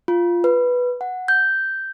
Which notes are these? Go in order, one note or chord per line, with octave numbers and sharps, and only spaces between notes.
F4
B4
F#5
G6